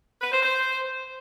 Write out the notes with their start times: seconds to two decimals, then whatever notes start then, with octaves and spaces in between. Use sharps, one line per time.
0.21 B4
0.32 C5
0.42 C5